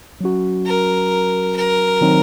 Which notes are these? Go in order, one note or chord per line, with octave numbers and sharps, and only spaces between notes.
F#3 C#4 F#4
A#4
A#4
D#3 F#3 C4 D#4